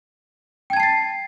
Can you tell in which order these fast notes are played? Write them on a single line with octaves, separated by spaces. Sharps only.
G5 G#6 A5 C7 A6